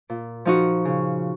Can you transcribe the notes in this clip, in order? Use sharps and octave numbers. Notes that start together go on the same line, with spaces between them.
A#2
F3 D#4 F#4
C#3